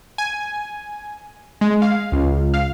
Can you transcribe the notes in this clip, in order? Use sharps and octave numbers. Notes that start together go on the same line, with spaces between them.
G#5
G#3
F5
C#2
F5